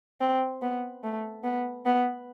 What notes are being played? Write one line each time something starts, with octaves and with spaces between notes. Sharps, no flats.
C4
B3
A3
B3
B3